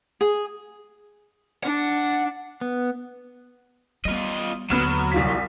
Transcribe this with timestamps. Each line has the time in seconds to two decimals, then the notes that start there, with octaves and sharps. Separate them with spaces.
0.21 G#4
1.64 D4 F#5
2.61 B3
4.05 G3 B3 F4 D#5
4.70 D#2 D3 F#3 B3 F6 E7
5.12 C2 F4 B6